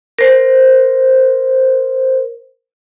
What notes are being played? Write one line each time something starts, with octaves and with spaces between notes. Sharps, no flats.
A#4 C5